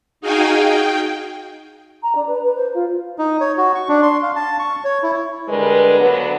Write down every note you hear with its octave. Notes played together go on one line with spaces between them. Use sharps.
D#4 F#4 G#4 F5 G5 G#5
G5
A#5
D4
B4
B4
C5
F4
D#4
C#5
F#4
C#6
D4
C6
F5
A5
C#6
C#5
E4
D3 G3 G#3 A#4 B4
D2 C#3 F#3 B3 D4 B4